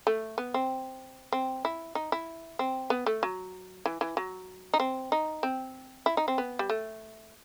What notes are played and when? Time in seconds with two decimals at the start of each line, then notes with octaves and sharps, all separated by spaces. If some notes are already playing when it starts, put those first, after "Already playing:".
0.07 A3
0.38 B3
0.54 C4
1.32 C4
1.65 E4
1.95 D#4
2.12 E4
2.59 C4
2.90 B3
3.06 A3
3.23 F#3
3.86 E3
4.01 E3
4.17 F#3
4.73 D#4
4.80 C4
5.12 D#4
5.43 C4
6.06 E4
6.17 D#4
6.28 C4
6.38 B3
6.59 G3
6.70 A3